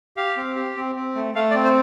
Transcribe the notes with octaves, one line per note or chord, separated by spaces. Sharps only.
G4 F5
C4
G4
C4
C4
A3
A3 F5
D5
C4
C5